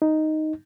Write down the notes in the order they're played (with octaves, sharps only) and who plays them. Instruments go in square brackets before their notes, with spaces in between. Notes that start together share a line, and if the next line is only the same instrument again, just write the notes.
[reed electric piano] D#4